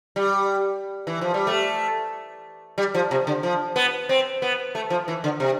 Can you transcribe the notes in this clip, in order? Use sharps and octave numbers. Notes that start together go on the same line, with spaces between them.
G3
E3
F3
G3
A3
G3
F3
C3
D3
F3
B3
C4
B3
A3
F3
E3
D3
C3